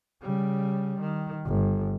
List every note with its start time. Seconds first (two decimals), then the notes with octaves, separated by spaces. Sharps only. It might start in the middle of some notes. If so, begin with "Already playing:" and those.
0.22 C#3 G3
1.00 D#3
1.46 G1